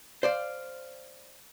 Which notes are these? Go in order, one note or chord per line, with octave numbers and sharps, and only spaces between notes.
C5 D5 F5